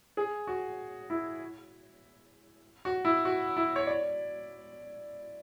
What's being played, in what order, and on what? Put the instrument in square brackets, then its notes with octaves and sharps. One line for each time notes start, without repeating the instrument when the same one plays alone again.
[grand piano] G#4
F#4
E4
F#4
E4
F#4
E4
C#5
D5